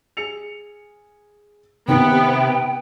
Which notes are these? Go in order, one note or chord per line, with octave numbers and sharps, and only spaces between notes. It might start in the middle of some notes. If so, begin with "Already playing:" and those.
G#4 C#7 F7
D#2 G#2 C3 D#3 B3 G5